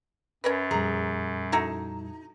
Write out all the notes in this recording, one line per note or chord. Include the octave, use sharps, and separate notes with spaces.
F#2 C#4 A#4 B4
F2 A#2 G3 G#4 A#5
D#4 E4 F#4 A4